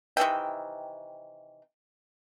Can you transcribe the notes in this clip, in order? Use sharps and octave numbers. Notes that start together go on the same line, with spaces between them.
C3 D#3 E3 G5